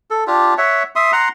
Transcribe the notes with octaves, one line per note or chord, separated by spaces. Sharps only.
A4
D4 F4 G4
C#5 E5 F#5
E5 C6 D#6
F#5 A#5 C6